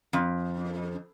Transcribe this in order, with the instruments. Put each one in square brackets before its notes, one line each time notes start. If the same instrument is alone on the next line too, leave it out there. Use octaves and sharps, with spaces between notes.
[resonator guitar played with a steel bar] F2